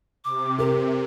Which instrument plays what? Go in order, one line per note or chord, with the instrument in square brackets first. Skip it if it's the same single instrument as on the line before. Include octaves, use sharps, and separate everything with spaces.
[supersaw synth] C3 [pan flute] D6
[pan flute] G4 [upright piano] A#4